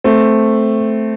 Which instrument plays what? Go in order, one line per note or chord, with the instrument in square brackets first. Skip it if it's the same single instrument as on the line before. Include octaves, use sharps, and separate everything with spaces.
[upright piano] A3 C4